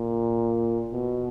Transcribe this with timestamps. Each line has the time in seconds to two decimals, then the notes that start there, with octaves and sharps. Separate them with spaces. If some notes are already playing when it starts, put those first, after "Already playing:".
Already playing: A#2
0.93 B2